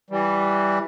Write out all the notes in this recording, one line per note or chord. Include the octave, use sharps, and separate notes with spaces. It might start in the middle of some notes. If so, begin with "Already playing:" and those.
E3 G3